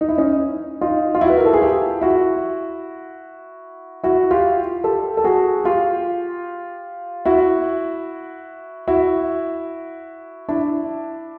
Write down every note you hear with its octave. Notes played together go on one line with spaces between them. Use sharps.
D#4
E4
C#4 D#4
D#4 F4
F4
E4 F#4
B4
A#4
A4
G#4
F4 G4
E4 F#4
E4 F#4
F4 G4
G4 A4
A4
F#4 G#4
F4 G4
E4 F#4
E4 F#4
D4 E4